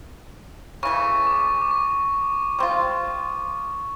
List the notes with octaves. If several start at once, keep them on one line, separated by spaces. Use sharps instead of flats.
C#3 E3 A3 C#6
D6
D6
C#6
G3 C4 F4